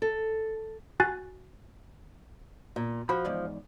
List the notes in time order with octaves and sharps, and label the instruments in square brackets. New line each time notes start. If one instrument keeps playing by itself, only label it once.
[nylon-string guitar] A4
[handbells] F#4 G#5 F#6 A6
[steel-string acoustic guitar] A#2
[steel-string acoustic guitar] F3 [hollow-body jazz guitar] F#4 B5
[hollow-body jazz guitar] E2 G#2 D5